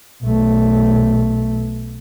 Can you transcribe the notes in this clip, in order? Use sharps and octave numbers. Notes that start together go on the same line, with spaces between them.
B1 A3